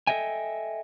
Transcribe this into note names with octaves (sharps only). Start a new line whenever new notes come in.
A4 A#4 D#5 E5 G5 G#5